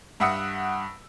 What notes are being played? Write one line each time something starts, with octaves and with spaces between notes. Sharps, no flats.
G2 E5 F#5 D#6 E6 C#7